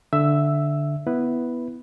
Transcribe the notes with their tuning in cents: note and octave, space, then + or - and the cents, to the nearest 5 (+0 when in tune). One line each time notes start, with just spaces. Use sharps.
D3 +0 E5 +10 E6 +0
B3 +0 E4 +0 B4 +0